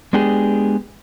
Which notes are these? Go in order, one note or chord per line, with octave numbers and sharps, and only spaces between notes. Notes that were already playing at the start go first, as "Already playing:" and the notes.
G#3 B3 D4 G4 G#4